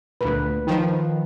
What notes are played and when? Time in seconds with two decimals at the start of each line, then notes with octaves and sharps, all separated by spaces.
0.21 D2 A#2 B4
0.67 D#3 F3